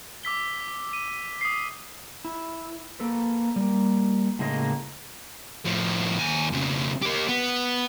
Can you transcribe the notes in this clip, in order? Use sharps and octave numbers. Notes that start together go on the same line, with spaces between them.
D6 E6 B6 G7
D#7
D#6 C7
E4
A#3 A4 B4
G3 A#3
A2 C#3 G#3 A#3 D#5
A2 F3
D#2 G#5
F2 C#3
A#3 G4
B3